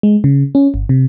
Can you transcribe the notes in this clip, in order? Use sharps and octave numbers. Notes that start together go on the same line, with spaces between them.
G#3
C#3
C#4
G1
C3